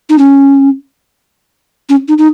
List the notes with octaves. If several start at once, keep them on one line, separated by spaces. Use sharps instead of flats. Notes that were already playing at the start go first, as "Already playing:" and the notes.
D#4
C#4
C#4
D#4
D#4